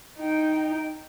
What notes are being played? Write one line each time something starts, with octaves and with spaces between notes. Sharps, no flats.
D#4 G5